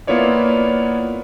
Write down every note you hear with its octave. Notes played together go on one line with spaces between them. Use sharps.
A#3 B3 E4 F4 C#5 D5